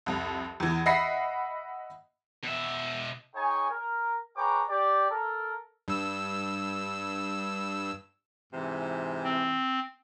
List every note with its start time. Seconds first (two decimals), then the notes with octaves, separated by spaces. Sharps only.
0.06 C2 F2
0.60 E2 E3
0.86 D#5 E5 F#5 B5 A#6 C7
2.44 B2 E5
3.34 D#4 G#4 C#5 G5 G#5
3.70 A#4
4.36 G#4 B4 C#5 G5 A#5 D6
4.68 G4 D5
5.10 A4 A#4
5.88 G2 E6
8.53 G#2 C3 E3
9.24 C4